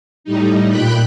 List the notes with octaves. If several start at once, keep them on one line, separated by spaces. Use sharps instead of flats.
A2 G3 D#4
A#2 G5 B5 F#6